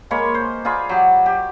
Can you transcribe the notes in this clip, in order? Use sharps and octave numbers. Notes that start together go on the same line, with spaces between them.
G#3 A#3 C#5 B5
C5
F4 G#4 D5 B5
F#3 G4
G4